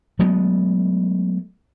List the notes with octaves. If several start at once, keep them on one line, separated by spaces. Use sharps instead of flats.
F#3 G#3 A3 B3